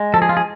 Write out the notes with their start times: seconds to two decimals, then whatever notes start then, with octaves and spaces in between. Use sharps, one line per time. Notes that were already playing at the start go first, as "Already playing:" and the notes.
Already playing: G#3
0.14 F3 A4
0.22 G#4
0.29 F4
0.37 G#4